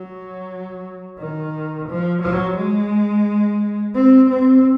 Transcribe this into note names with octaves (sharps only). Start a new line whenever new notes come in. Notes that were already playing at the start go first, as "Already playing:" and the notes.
Already playing: F#3
D#3
F3
F#3
G#3
C4
C4